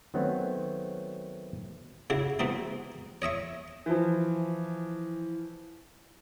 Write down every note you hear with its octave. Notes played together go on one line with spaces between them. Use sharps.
D#3 F#3 A3 B3 C4 C#5
C#3 E4 F#4
B2 E3 C4 D#4
C#5 D#5 E5 C#6
E3 F3